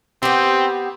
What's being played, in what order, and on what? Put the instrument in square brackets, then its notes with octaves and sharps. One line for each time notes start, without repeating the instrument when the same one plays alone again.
[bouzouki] B3 G4 [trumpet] C4